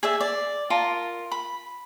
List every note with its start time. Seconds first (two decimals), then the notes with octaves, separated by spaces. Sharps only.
0.03 G#4 D5 E5
0.21 D5
0.70 F4 A#4 A5
1.31 B5